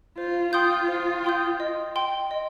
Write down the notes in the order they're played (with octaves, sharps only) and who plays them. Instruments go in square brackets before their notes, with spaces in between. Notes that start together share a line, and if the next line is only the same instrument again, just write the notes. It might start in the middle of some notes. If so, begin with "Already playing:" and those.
[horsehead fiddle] F4 [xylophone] C5
[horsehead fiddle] F4 [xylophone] G5 C6 D#6 G6
[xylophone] C5
G5 C6 D#6 G6
D#5
G5 C6
D#5